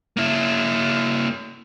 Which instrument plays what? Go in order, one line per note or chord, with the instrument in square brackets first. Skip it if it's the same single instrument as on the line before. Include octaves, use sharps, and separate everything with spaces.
[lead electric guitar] A#3 E4